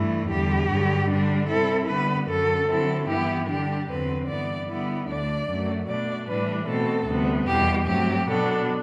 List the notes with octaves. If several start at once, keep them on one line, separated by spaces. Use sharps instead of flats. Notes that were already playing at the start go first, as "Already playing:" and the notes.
Already playing: G2 E3 A3 E4
E2 D3 G3 G4
G2 D3 F#3
D3 G3 D4
C3 G3 C4 E4 A4
D3 G3 B3 B4
F#2 D3 F#3 A4
D3 F#3 C4 E4 A4
G2 E3 B3 E4 G4
D3 G3 D4 G4
E2 D3 F#3 C4 B4
G2 E3 B3 D5
D3 G3 B3 E4 D5
D2 D3 A3 D4 D5
F#2 F#3 A3
B2 A3 D4 D5
A2 E3 G3 D4 B4
B2 A3 C4 A4
D2 C3 G3 B3
E2 B2 G3 G4
G2 F#3 A3 C4 G4
B2 F#3 B3 D4 A4